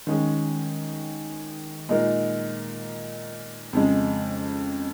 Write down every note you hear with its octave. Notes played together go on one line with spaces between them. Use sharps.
D#3 G#3 C#4 G#4
A#2 G#3 D#4 A#4
F2 C#3 G#3